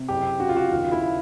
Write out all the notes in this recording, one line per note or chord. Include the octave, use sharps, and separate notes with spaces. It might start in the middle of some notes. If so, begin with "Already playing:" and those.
Already playing: C3
F#1 G4
C#3 F#4
F4
F#4
D#2 F4
E4